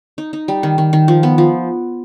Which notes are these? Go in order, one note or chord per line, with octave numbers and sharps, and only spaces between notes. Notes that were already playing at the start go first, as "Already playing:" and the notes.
D#4
D#4
G3
D#3
D#3
D#3
F3
B3
F3